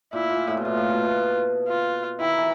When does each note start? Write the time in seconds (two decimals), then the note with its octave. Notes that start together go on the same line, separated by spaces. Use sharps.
0.13 A#2 E4
0.30 A#2
0.47 A2
0.57 B2
0.64 A#2 F4
0.77 A2
0.90 B2
1.04 B2
1.68 F4
2.21 D#3 E4
2.38 E3